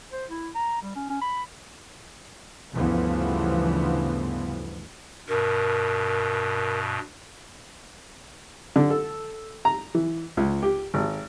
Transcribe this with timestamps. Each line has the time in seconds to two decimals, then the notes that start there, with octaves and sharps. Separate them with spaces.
0.13 C5
0.30 E4
0.55 A#5
0.82 G3
0.95 C#4
1.10 C#4
1.22 B5
2.74 D2 G2 C#3 E3 F3 B3
5.29 G2 B2 A#4
8.76 D3
8.90 A4
9.65 A#5
9.95 E3
10.37 C#2
10.63 G4
10.94 G#1